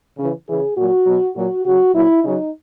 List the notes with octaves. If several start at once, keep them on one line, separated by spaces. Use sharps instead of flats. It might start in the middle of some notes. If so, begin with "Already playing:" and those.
C#3 E3
C#3 E3 G#4
A#2 F#3 F#4
B2 F#3
A#2 F#3 F#4
C#3 F#3 F#4
A#2 F#3 E4
C#3 F#3 D#4